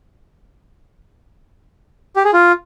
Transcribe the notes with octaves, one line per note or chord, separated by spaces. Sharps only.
G4
G#4
F4